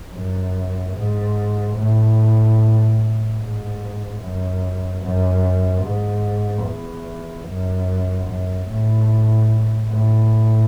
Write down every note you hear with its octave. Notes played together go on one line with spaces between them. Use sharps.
F#2
G#2
A2
G#2
F#2
F#2
G#2
E2
F#2
F#2
A2
A2